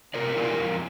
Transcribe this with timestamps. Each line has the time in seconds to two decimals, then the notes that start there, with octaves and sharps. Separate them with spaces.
0.14 C3 A#4 D5
0.36 E3 G3 A#3 F4
0.58 F2